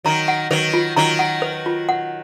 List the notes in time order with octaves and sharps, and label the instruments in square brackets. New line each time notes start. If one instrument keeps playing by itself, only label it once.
[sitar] D#3 F#3 [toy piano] A#5
[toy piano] F#5
[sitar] D#3 F#3 [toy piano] B4
[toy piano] F4
[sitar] D#3 F#3 [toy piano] A#5
[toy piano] F#5
B4
F4
F#5